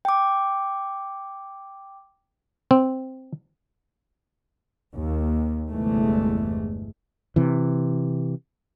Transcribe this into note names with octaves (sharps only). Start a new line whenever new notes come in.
G5 D6
C4
D#2
G1 E2 C3 E3 G#3 A3
C3 E3